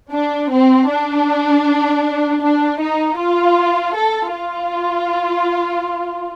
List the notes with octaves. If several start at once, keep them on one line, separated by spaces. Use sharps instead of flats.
D4
C4
D4
D4
D#4
F4
A4
F4